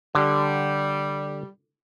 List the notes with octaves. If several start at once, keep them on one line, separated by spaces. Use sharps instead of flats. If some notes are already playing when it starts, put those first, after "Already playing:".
D3 G3